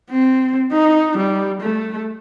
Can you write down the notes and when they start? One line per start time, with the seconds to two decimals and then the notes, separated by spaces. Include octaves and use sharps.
0.11 C4
0.72 D#4
1.18 G3
1.61 A3